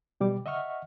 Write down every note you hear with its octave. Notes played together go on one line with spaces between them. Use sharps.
B2 G3 D6
D#5 E5 F#5 C#6 F6